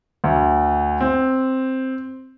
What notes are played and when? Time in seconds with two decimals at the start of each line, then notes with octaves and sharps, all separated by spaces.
0.24 D2
1.00 C4